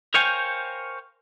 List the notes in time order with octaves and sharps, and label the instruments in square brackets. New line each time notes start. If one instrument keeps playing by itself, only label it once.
[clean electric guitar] A#4 C5 C#5 F5 G5 G#5